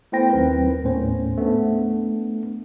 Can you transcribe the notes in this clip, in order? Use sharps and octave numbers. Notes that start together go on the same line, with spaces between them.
A3 B3 E4 C5 G5 A#6
D#2 F#3 C4 D#4 A#4 B4
D#2 A2 A3 B3 C#4 C5
A3 B3 D4